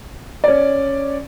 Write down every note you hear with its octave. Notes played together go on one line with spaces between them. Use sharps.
C#4 D5